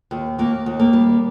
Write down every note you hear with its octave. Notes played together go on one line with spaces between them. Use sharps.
D#2
D#2 A#3
D#2
A#3
G3